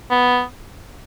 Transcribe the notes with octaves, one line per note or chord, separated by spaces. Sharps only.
B3